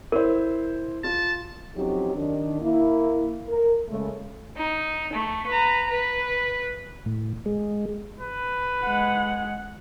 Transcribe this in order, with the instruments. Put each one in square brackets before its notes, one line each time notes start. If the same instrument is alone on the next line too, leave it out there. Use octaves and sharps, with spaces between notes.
[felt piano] E4 C5 [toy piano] A#4
[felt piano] F4 [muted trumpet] A5
[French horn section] F2 F#3 C4 C#4 D#4 G4
D#3 D4
A#3 E4
A#4
C#3 G#3 A3
[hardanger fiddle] D#4
A3
B4 A#5
B4
[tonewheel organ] A2
G#3
[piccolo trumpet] B4
[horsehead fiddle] G#3 F#5